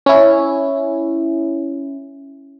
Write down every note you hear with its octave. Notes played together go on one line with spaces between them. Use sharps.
C#4 E4